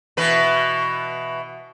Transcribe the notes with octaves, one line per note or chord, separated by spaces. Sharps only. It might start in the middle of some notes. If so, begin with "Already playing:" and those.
B2 E3 B4